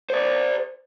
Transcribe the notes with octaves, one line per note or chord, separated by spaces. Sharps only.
C5 D5